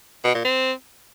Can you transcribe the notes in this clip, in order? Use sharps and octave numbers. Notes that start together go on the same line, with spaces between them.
B2
A#2
C4